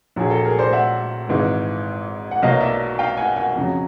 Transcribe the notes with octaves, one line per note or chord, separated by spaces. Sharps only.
A#1 A#2 F#3 G#4
A4
G#4 A#4
C5 D5
E5 F#5
G#1 G#2 E3
F#5
B1 B2 F#3 A#3 D#5 F5
D5 E5
F5 G5
F#5 G#5
F#5 G#5
F2 C#3 F#3